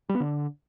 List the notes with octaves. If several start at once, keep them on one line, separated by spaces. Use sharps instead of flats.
G3
B3
D3